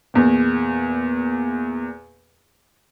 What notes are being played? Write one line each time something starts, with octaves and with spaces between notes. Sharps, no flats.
E2 A#2